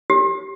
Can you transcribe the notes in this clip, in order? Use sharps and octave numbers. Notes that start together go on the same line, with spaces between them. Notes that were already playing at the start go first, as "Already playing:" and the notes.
G4